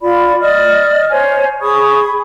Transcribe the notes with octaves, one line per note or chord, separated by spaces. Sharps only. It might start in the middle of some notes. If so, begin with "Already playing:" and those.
F4 D5 B5
D5 D#5 F6
C5 C#5 G#5
G#4 B5 C#6 D#6